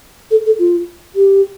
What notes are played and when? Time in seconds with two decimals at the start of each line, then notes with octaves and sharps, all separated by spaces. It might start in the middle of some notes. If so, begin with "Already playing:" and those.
0.31 A4
0.46 A4
0.59 F4
1.16 G4